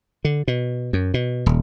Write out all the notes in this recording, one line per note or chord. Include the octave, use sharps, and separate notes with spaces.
D3
B2
F#2
B2
D#1